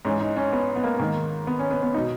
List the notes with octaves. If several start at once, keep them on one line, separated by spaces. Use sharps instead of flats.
G#2 E3 C#4
D#4
C#4
B3
B3
A#3
G#2 D#3 A#3
B3
C#4
B3
B3
B2 D#4